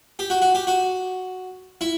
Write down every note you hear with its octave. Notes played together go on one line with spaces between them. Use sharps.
G4
F#4
F#4
G4
F#4
E4